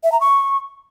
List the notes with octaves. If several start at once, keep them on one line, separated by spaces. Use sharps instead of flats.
E5
A#5
C#6